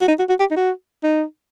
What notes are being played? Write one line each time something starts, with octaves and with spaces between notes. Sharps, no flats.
F#4
D#4
F#4
F#4
G4
D#4
F#4
D#4